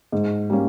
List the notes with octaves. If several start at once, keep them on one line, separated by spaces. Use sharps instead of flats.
G#2
G3 A#3 C#4